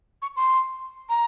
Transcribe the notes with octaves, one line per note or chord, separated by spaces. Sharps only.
C#6
C6
A#5